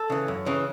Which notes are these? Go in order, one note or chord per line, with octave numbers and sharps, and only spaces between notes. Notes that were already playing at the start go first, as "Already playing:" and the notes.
Already playing: A4
C#3 E3
F#2
C#3 E3